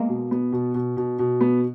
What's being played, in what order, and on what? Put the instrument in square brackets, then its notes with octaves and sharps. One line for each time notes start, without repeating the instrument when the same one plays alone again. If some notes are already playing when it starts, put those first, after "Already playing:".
Already playing: [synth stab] G#3 A#3 [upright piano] B3
[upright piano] B2
B3
B2
B2
B2
B2
B3